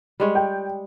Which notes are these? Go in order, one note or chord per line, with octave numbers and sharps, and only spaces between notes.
G3 G#3 C#5
G5